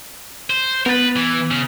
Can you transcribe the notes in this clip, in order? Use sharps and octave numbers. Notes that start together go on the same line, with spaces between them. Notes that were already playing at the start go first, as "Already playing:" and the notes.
C5
B3 A#4 B4 A6
E3
C#3